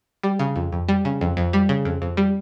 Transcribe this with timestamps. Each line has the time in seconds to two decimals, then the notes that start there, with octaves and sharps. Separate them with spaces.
0.23 G3
0.39 C#3
0.56 F2
0.72 F2
0.89 G3
1.05 C#3
1.21 F2
1.37 F2
1.53 G3
1.69 C#3
1.85 F2
2.02 F2
2.17 G3